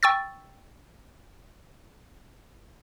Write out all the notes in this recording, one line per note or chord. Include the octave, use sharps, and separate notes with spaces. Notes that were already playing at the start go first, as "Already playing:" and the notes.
G5 C#6 E6 A6